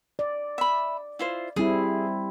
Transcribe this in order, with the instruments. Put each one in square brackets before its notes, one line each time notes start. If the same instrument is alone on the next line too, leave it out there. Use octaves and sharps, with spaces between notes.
[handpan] D5
[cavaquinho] E5 B5
E4 F4 C5
[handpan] G3 C4 E4 [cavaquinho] G#4